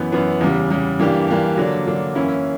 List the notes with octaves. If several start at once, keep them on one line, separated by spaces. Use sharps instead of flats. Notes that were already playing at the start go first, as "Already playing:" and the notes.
Already playing: F#2 E3 B3
F#2 E3 B3
E2 C#3 G3
E2 C#3 G3
G2 E3 A#3 D4 G4
G2 E3 A#3 D4 G4
D3 F#3 A#3 D4
D3 F#3 A#3 D4
F#2 E3 A#3 C#4 E4